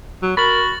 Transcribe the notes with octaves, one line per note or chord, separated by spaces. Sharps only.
F#3
F#4 A#4 B5 A6 F#7